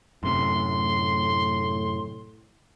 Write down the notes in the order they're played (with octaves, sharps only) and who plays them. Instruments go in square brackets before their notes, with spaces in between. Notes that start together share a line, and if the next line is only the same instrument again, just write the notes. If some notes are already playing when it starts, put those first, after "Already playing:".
[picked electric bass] F#2 C3 [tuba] A2 [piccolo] C6